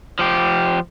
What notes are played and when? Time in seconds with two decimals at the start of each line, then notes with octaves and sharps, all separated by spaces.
0.19 F3 G4